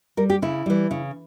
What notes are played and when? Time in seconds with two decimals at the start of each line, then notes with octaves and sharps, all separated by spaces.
0.17 G3 A#4
0.30 G4
0.42 C#3 E4
0.66 E3 G3
0.91 C#3